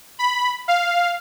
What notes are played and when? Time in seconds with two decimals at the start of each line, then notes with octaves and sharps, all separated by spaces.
0.19 B5
0.68 F5